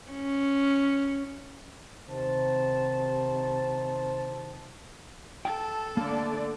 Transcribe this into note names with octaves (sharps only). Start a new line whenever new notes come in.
C#4
C3 D#3 C5 A5
A4 G5 A5
D3 A3 A#3 D5